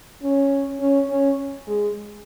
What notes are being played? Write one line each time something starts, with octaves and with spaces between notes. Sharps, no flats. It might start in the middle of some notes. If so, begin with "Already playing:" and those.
C#4
C#4
C#4
G#3